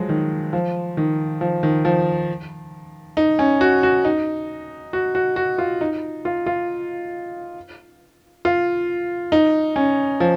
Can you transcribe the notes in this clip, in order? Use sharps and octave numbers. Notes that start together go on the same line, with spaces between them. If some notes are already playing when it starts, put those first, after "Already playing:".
Already playing: F3 F#3 G#3
D#3
F3
D#3
F3
D#3
F3
D#4
C#4
F#4
F#4
D#4
F#4
F#4
F#4
F4
D#4
F4
F4
F4
D#4
C#4
F3